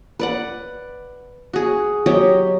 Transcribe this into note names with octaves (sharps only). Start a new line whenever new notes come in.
B4 D5 F#5
F#4 G#4
F#3 G4 C#5 D#5